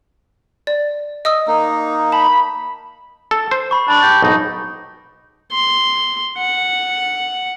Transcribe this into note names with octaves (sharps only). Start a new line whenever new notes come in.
D5
D#5 D#6 E6
A#3 D#4
A5 B5
A4
C5
B5 C#6
D4 A5 B5 C#6
G4
B1 G#2 D#4
C6
F#5